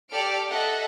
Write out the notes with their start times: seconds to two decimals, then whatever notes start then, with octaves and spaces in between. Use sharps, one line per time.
0.10 G4 A4 D5 F6 D7
0.49 A4 D#5 E5 F#5